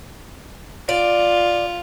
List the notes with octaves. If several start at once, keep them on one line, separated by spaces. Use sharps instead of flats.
F4 D5